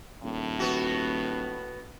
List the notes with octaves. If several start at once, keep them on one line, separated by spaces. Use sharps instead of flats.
D#1 A2
B3 F#4